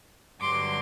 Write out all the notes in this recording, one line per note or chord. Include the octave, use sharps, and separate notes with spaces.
G2 D3 F#3 C6 D6